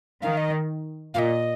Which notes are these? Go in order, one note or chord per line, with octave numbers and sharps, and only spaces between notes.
D#3 F5
D#5
A#2 D#5 F5